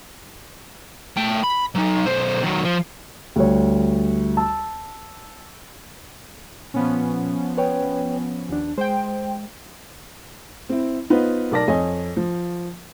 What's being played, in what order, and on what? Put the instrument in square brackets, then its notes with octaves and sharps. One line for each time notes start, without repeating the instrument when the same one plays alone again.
[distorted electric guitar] A3 G5
B5
F#3 D#4
B1 C5
D#3 F#3
F3
[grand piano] D2 G3 C#5
A5 E6
[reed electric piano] A#2 [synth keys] F3 B3 C#4
[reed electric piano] B4 C#5 G5
D#2 D4
[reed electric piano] G#3 [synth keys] C5 G5
[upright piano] C4 E4
B3 D#4 F4 B4 C5
B1 A#4 D5 A5 A#6
F2 C#5 D#5 G#5
F3